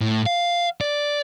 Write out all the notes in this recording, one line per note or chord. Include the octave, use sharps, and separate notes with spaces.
A2
F5
D5